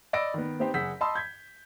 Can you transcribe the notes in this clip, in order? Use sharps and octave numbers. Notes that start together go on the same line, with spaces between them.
D5 D#5 B5 E6 A#6 D7
D#3 B3
B3 C4 D#4 G4 C5
F#1 G#4 F#5 E6 G6 B6
D#5 A5 B5 C6 D#6 E6
G6 G#6 B6